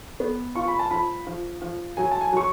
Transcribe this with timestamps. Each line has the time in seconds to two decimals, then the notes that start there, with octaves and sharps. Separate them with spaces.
0.20 B3
0.56 F4 C#6
0.68 B5
0.79 A5
0.91 F3 B5
1.27 F3
1.62 F3
1.97 F#3 G#5
2.11 A5
2.21 G#5
2.33 F#3 C#6